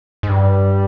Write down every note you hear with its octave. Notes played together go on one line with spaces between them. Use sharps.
G#2
G2 G3